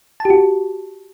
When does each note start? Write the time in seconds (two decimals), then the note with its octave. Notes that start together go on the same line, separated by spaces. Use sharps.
0.20 A5
0.25 G4
0.30 F#4